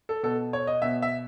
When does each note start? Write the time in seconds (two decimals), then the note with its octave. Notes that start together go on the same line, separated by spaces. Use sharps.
0.09 A4
0.23 B2 A4
0.53 C#5
0.67 D#5
0.82 B2 E5
1.02 E5